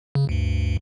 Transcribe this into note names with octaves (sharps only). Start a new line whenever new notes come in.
C#3
D2 G2